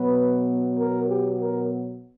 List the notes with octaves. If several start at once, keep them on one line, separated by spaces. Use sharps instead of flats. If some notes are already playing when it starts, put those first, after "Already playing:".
Already playing: B2 F#3 B3 B4
A#4
G4
A#4